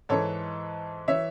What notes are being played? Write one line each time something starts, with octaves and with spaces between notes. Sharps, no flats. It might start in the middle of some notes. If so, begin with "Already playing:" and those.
G#2 E3 A4 C#5
E3 C#5 E5